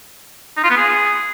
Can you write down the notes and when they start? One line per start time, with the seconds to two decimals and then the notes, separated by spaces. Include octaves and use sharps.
0.57 D#4
0.64 F4
0.70 B3
0.77 G#4